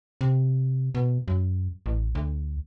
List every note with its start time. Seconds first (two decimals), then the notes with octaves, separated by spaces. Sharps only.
0.21 C3
0.95 B2
1.28 F#2
1.86 A1
2.15 D2